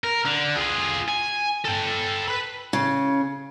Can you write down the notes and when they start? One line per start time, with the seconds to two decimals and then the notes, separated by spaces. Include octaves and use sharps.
0.04 A#4
0.26 D3
0.56 F4 G#4
1.08 G#5
1.65 A4 G5
2.28 B4 B5
2.73 C#3